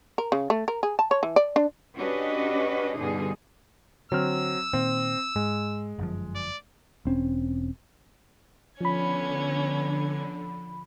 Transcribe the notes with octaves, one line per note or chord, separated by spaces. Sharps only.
A#4
C#3
A3
A#4
G#4
A5
C#5
E3
D5
D4
C#4 D4 F#4 G4 B4 D#5
G2 B2 D3 G3 D#4 G#4
D3 F#3 C4 E6 F6
A#2 D#3 C4
G#2 G#3
G1 F#2 F3
D5
E1 C4 C#4
D3 F3 B3 C#4 B5 G#6